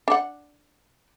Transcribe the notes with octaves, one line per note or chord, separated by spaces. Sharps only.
D4 F#5